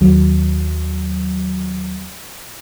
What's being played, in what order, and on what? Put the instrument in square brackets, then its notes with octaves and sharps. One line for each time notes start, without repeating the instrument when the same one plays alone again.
[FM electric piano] D#2 F#3